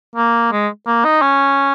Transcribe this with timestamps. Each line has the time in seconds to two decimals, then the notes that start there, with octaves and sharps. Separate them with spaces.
0.16 A#3
0.52 G#3
0.87 A#3
1.05 D#4
1.22 C#4